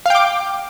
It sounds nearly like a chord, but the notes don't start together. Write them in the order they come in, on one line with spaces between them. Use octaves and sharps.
F5 G5 D6